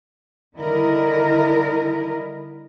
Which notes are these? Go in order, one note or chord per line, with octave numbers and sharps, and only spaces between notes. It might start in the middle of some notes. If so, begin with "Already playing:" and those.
D3 D#3 G3 E4 A#4 D#5